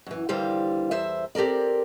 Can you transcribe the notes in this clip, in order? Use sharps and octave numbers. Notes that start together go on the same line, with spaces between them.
F#2 E3
D#2 D3 E3 G3 C5 F5
E2 C5 E5
C4 G4 A4 A#4 D5